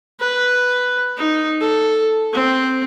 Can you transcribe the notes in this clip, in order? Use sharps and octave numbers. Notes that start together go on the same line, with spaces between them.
B4
D#4
A4
C4